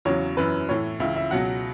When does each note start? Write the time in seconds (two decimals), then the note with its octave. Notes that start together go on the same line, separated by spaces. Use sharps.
0.05 E2 C#3 F#3 C#5
0.37 F#2 E3 B4
0.69 A2 E3 C#5
1.00 C#2 C#3 E3 E5
1.16 E5
1.31 C#2 B2 F#3 F#5